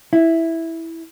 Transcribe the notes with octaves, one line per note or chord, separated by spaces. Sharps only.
E4